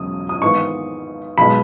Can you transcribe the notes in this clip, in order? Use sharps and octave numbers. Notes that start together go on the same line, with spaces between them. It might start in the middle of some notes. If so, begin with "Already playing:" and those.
Already playing: E1 C#3 F#3 D#6
D#6
G#1 G#2 E3 B3 C#6
B1 B2 G#3 B5